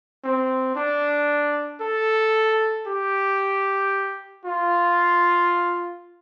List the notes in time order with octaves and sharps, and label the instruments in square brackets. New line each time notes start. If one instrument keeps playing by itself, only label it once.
[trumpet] C4
D4
A4
G4
F4